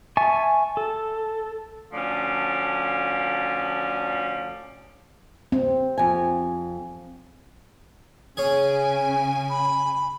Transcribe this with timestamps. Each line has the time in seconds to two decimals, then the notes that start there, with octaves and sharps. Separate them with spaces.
0.17 E5 G#5 A5 C#6
0.77 A4
1.93 D2 F3 C#4 D5
5.52 C4
5.98 F2 G#5
8.37 C#3 C#4 G#4 G#5
9.50 B5